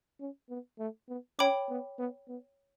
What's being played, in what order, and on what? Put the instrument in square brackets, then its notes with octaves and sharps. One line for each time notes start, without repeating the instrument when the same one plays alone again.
[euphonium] C#4
B3
A3
B3
[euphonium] C#4 [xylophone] C#5 G5 B5 D6
[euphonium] B3
B3
B3